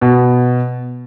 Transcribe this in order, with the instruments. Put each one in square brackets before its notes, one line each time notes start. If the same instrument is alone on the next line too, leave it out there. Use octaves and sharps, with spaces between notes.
[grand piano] B2